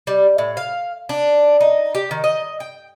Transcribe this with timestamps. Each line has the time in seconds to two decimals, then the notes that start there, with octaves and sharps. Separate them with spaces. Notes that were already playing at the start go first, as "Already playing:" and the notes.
0.07 G3
0.38 A2
0.57 F5
1.09 D4
1.61 D#4
1.95 G4
2.11 D#3
2.24 D#5
2.60 G5